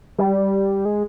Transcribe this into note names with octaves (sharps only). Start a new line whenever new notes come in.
G3
G#3